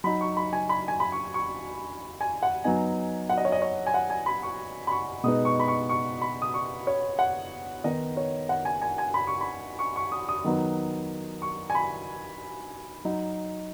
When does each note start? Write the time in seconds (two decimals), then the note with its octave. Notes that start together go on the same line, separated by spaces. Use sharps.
0.04 F#3 D#4 B5
0.21 C#6
0.37 B5
0.53 G#5
0.69 B5
0.88 G#5
1.00 B5
1.12 C#6
1.34 C#6
2.21 G#5
2.43 F#5
2.64 F#3 B3 D#4 G#5
3.29 F#5
3.38 D#5
3.45 C#5
3.52 D#5
3.62 C#5
3.87 G#5
3.94 F#5
4.10 G#5
4.26 B5
4.43 C#6
4.87 B5
4.92 C#6
5.24 B2 G#3 B3 D#4 D#6
5.45 C#6
5.60 B5
5.68 C#6
5.89 C#6
6.22 B5
6.42 D#6
6.54 C#6
6.87 C#5
7.19 F#5
7.84 D#3 B3 D#4 D#5
8.17 C#5
8.49 F#5
8.65 G#5
8.82 G#5
8.98 G#5
9.14 B5
9.27 C#6
9.41 B5
9.79 C#6
9.96 C#6
10.12 D#6
10.29 D#6
10.44 D#3 F#3 B3 D#4
11.42 C#6
11.70 G#5
11.75 B5
13.05 F#3 D#4